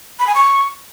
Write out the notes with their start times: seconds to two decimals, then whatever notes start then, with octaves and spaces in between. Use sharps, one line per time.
0.19 B5
0.27 G#5
0.35 C#6